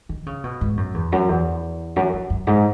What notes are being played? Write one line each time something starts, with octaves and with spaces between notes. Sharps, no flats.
D#3
C#3
B2
G#2
F#2
E2
F#2
E2
F#2
F#2
F#2
G#2